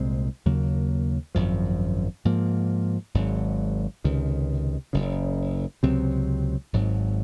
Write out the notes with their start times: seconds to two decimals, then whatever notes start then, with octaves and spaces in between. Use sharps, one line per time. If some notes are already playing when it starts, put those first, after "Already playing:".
Already playing: C2 A#2 G#3 C4
0.45 D#2 C#3 F#3 A#3
1.35 G#1 F#2 F3
2.25 G#2 F3 A#3
3.14 G#1 G#2 F#3
4.04 C#2 C3 D#3
4.93 F#1 F#2 C#3
5.83 C#2 C3 F#3 C4
6.73 G#1 G#2 F#3